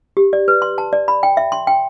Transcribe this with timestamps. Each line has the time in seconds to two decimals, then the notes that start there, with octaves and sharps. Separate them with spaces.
0.17 G4
0.33 D5
0.48 B4
0.62 C6
0.78 A5
0.93 D5
1.08 B5
1.23 G5
1.37 E5
1.52 C6
1.67 G5